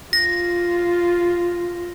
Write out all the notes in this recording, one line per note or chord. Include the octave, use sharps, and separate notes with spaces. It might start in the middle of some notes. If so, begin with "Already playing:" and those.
F4 A#6